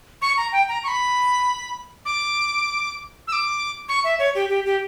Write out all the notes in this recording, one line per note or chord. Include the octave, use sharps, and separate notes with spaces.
C#6
A#5
G5
A#5
C#6
B5
D6
E6
D6
C#6
E5
C#5
G4
G4
G4